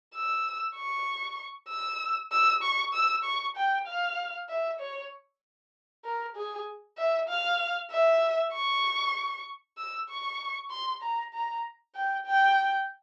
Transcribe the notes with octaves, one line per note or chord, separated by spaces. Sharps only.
E6
C#6
E6
E6
C#6
E6
C#6
G5
F5
E5
C#5
A#4
G#4
E5
F5
E5
C#6
E6
C#6
C6
A#5
A#5
G5
G5